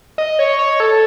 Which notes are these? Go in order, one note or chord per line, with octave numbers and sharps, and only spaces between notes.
D#5
C#5
C#5
A4